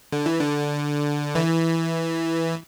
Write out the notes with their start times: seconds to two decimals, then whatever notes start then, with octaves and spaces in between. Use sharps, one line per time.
0.13 D3
0.26 E3
0.40 D3
1.35 E3